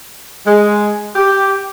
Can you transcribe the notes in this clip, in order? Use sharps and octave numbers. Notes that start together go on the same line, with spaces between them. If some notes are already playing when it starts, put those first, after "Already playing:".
G#3
G4